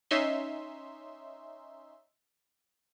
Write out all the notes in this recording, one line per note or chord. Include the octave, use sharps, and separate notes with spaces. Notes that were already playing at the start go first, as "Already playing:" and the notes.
C#4 D#4 E5 C6